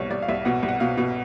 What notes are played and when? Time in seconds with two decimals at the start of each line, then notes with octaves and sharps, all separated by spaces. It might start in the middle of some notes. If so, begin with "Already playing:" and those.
Already playing: C2 B2 C#5
0.10 C2 D5
0.22 F5
0.29 C2 E5
0.45 B2 F#5
0.63 C2
0.68 F#5
0.80 B2 F5
0.97 B2